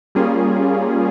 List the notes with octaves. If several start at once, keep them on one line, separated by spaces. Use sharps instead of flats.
G3 A#3 C#4 F4 G#4